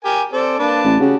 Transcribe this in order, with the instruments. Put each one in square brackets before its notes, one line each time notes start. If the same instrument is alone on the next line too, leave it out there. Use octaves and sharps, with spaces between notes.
[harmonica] G4 A#4 G#5
[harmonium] C4 C5 [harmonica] A4 D5
[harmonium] A#3 D4 [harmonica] B4 D5 A5
[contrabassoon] A1
[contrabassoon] C#3 [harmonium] F#4 G4